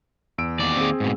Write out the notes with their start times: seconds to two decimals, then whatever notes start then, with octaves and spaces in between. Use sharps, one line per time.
0.38 E2 E6 D7
0.60 D#2 D5
0.77 C4 G#4
1.00 G#2 B2